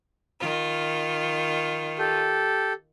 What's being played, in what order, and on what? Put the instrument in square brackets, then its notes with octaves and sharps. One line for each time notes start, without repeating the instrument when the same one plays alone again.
[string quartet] D#3 F4
[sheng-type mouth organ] G4 A4